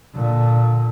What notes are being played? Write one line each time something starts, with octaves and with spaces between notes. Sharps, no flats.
A#2 D3